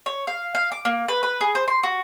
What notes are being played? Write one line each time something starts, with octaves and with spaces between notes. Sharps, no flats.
C#5
F5
F5
D6
A#3
B4
B4
G#4
C5
C6
F#4